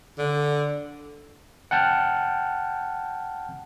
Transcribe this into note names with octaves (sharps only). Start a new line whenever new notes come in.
D3
F#5 G5 A5 F6 G6